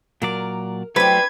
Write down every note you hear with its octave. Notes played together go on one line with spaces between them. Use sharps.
A#2 F#3 A#4 D5
F#3 G3 A3 C4 D4 B4 G#6